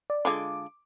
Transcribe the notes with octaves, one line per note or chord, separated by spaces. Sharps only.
D5
D3 G#3 F4 D6